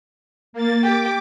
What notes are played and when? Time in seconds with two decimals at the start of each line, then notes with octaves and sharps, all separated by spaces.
0.53 A#3 A6
0.83 G4 D6